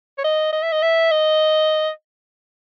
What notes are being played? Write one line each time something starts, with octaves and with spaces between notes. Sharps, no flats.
C#5
D#5
D#5
E5
D#5
E5
D#5